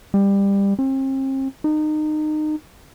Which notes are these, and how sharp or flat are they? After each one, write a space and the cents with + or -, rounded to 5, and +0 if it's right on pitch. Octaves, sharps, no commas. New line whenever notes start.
G3 +20
C4 +40
D#4 -25